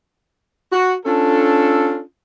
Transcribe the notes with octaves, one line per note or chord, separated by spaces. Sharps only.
F#4
C#4 D4 F4 A4